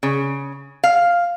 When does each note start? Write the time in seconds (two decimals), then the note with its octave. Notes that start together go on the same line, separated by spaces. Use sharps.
0.03 C#3
0.84 F5